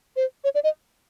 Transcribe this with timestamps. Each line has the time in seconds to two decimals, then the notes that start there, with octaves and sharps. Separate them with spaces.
0.16 C5
0.44 C#5
0.55 D5
0.64 D#5